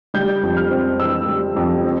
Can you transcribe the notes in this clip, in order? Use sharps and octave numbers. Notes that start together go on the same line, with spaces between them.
G3 G6
F2
F6
C4
E3 E6
G3
F2
C4